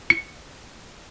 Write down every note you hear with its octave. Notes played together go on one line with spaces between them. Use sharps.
C#7